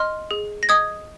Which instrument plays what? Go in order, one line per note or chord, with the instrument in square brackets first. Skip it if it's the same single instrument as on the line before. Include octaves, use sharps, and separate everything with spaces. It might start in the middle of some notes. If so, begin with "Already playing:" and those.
Already playing: [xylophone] D#5 C6 F6
G#4
A#6
D#5 D#6 G#6